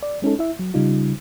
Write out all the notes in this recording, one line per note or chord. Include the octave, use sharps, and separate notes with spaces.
D5
G#3 C#4 D#4 A4
E4 E5
F#3
C#3 G3 D#4 F4